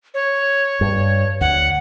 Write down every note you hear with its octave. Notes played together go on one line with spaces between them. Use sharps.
C#5
G2
D2 F#5